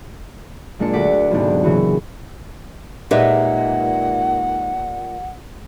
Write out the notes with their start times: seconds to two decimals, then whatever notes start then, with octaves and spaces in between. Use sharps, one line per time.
0.79 A#2 G#3 A#3 D4 F4 C#7
0.93 D2 F#4 F#5 D6 B6
1.30 B1 E2 G#2 C3 C4 D4
1.63 A#2 C#3 E3 F#4
3.11 A#2 G#3 D#4 G4 B4 E5 F#5